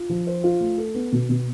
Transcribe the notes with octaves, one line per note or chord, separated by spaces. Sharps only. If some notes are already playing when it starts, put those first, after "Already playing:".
Already playing: F4
F3
C5
F4
A3
A4
B3
B2
B2